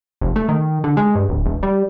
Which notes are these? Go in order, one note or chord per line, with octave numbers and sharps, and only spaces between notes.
F1
A3
D#3
D3
G#3
G2
D1
E1
G3